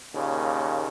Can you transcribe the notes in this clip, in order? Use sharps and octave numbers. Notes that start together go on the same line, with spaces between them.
D#2 A#2 C#3